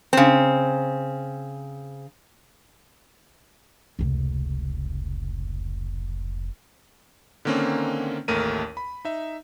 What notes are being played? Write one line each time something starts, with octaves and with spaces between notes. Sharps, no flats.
C#3 C4
F1 C#2
D3 D#3 A#3 C4 C#4
A1 D#2 A3 A#4 D#7
B5
D#4 E5